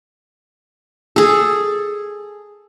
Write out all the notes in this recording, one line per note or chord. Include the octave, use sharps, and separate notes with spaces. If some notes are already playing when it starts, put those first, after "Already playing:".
G#4 A4